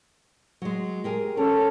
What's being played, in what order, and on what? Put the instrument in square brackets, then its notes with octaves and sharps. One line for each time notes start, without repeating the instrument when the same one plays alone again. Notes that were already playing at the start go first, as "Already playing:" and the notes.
[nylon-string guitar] F#3 G#3
G4 G#4 A#4
[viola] C#4 [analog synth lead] A4 [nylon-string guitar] A#4